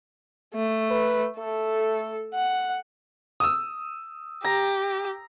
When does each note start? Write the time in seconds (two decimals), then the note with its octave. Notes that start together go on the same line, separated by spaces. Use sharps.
0.55 A3
0.91 B4
1.39 A3 A4
2.35 F#5
3.40 D#6 E6
4.44 G4 A#5